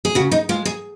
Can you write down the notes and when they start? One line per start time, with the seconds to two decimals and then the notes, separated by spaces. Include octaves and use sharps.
0.05 G#4
0.15 C#3 F#4
0.31 D#4
0.49 G#3 F4
0.65 G#4